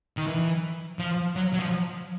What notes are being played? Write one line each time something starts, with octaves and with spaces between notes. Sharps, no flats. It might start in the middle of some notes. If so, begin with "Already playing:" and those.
D#3
E3
F3
F#3
F#3
F3